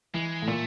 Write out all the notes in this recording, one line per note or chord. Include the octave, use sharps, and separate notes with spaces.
E3 G#3
A2
A#2 A3